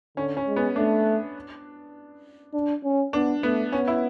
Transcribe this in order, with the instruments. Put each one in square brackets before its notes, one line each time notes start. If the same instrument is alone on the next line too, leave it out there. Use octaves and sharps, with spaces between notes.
[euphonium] D3 [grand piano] C#4
[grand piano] C#4
[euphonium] G#3
[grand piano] B3
[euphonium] A3 [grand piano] D4
[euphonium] D4
C#4
[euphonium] B3 [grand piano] D4
[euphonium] A3 [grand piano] B3
[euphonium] B3 [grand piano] C#4
[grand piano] E4